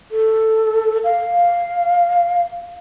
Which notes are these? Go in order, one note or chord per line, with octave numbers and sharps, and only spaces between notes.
A4
F5